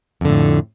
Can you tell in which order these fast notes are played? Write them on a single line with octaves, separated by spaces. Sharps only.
F2 D3 A2